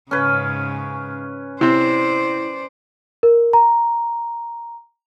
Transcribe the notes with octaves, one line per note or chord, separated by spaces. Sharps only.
G#2 C#3 C#4 B4
C3 C4 E4 C5 D5
A#4
A#5